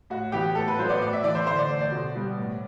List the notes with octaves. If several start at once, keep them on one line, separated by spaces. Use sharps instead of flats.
A2 F#4
E3 B3 G4
A2 A4
B4
F#3 B3 C5
D5
A2 D5
E5
E3 A3 D5
C5
D3 C5
D5
A3
D5
B2
G3 B3
A2